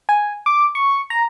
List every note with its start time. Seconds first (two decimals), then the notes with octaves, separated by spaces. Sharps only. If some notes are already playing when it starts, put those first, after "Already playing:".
0.09 G#5
0.46 D6
0.75 C#6
1.10 A#5